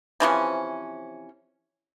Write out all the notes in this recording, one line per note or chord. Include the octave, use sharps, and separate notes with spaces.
C3 E3 F3 C#4